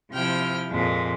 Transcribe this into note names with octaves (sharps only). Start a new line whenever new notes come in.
C3 F3 E4 G5 F6
F2 A#2 G#3